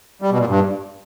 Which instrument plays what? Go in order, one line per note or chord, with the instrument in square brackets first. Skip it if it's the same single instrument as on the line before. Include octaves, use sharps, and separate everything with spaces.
[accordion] G3
B2
A#2
G2